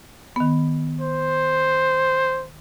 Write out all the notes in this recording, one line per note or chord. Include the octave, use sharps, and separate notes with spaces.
D#3 B3
C5